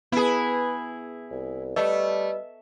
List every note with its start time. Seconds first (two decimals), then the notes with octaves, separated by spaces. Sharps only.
0.12 B3 E4 G#4 B4
1.31 C2
1.76 G3 A3 B4 D#5 E6